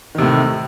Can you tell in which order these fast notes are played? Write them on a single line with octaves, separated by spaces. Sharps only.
D#3 C3 A2